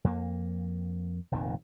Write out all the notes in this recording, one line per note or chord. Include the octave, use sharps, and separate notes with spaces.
F2 A#3
F1 A#1 F2 D#3